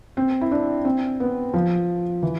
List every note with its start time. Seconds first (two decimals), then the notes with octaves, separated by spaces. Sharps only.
0.17 C4
0.41 E4
0.51 D4
0.85 C4
1.20 B3
1.54 F3
2.23 E3